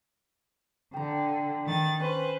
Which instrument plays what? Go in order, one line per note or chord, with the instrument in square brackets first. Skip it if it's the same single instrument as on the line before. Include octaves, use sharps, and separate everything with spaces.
[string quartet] D3 [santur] G5 A#5
[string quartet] D#3 A6
[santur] C#4 [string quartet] B4 C5